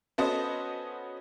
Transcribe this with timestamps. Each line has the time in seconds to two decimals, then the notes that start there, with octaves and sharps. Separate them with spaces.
0.18 B3 C#4 F#4 A4 C5 D#5